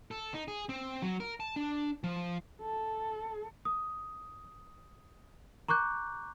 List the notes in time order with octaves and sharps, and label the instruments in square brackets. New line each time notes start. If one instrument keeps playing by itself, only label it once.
[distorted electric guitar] A4
D#4
G#4
C4
F#3
A#4
A5
D4
F3
[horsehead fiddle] A4
[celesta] D#6
A#5 C#6 D6 F#6 G6